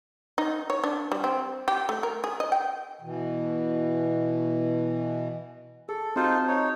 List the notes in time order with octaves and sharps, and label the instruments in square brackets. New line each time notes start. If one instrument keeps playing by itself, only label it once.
[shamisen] D#4
C#5
D4
G3
C4
G4
A3
A#4
G#4
D#5
G5
[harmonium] B2 E3
[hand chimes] G#4 [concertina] A4
[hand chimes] C4 F#4 A5 [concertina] D#4 F4 C5
[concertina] D#4 C#5